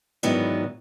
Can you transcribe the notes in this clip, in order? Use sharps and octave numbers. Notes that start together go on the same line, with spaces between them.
G#2 D#3 E3 F#3 B3 D4